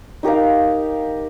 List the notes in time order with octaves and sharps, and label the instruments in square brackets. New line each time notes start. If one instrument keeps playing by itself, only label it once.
[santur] D#4 G4 A#4 F5